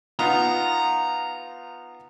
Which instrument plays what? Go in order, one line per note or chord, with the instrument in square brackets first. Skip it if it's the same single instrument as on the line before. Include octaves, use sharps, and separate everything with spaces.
[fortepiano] B3 D#4 F4 [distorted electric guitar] A#5